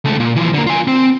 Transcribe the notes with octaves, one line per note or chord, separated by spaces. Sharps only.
C#2 A3
A#2
E3 F3
D3 A#3
F4 G#5
C4